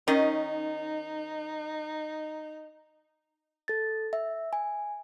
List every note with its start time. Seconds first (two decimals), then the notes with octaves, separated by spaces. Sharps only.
0.08 D#3 C#4 D#4 D#5
3.68 A4 A6
4.13 E5
4.53 G#5